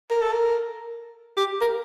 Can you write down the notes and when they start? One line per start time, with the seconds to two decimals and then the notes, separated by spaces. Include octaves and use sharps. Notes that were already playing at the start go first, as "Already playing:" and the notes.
0.10 A#4
0.21 A4
0.33 A#4
1.37 G4
1.61 A#4